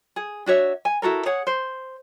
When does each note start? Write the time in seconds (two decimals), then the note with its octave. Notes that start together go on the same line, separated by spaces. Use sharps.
0.16 G#4
0.46 D4 F#4 C#5 E5
0.85 G#5
1.02 E4 F#4 A4 A#4
1.26 G#4 C#5 F#5
1.47 C5